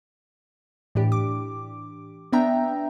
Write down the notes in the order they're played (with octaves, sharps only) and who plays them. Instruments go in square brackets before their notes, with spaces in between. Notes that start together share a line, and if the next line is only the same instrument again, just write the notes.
[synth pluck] A2 E3 D4 G4
D6
B3 D4 E5 G5 A#5